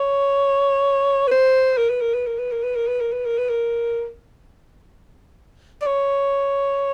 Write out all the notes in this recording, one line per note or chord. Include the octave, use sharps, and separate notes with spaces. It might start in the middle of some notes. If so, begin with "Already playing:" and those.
Already playing: C#5
B4
C5
A#4
B4
A#4
B4
A#4
B4
A#4
B4
A#4
B4
A#4
B4
A#4
B4
A#4
D5
C#5